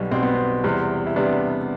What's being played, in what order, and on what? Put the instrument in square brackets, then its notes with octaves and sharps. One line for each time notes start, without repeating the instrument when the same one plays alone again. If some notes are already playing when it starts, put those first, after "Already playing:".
Already playing: [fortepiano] B1 B2 G3
B1 B2 G3 C4
B3
C4
E2 C3 G3
E4
E2 C3 G3 B3 D4